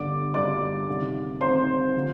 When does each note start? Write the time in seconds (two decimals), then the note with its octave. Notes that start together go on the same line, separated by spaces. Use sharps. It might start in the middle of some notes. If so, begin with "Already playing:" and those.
Already playing: G1 G2 D3 D5 D6
0.34 G1 G2 D3 D5 D6
0.88 C2 C3 D#3
1.41 C2 C3 D#3 C5 C6
1.95 D3 F3